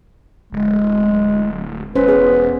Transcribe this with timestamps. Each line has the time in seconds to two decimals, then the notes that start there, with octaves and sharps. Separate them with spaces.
0.53 D1 G#3
1.95 E1 C#4 B4 C5
2.08 B3 G#4